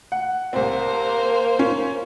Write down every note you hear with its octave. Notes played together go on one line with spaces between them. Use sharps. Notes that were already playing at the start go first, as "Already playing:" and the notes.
F#5
C2 A#3 C4 C5
C#4